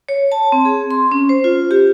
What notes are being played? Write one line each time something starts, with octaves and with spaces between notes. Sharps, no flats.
C#5
A5
C4
G#4
C6
C#4
C5
F4
G4